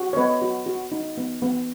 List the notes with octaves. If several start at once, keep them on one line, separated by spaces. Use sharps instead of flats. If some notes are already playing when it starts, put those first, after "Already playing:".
Already playing: F#4
C#5
B3 B4 D#5
F#4
F#4
D#4
B3
B3